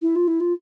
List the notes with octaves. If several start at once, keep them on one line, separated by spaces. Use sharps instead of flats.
E4
F4
E4
F4